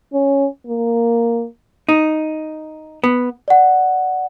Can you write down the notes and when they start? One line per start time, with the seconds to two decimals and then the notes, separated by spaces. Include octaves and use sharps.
0.14 C#4
0.67 A#3
1.89 D#4
3.04 B3
3.48 D5 F#5